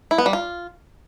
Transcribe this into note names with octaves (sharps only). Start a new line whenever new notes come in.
E4
B3
G3
F4